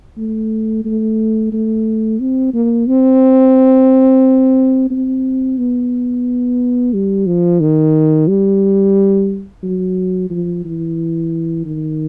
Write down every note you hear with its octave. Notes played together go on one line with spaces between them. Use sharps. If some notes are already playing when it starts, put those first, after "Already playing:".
A3
A3
A3
C4
A#3
C4
C4
B3
G3
F3
D#3
G3
F#3
F3
E3
D#3